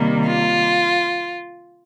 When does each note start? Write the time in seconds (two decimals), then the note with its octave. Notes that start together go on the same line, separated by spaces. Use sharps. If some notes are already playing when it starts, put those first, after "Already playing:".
Already playing: C3 D#3 G3 A#3
0.26 F4